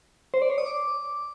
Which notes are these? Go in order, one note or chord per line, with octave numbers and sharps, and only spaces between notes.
C5
D5
C#5
D#6
D6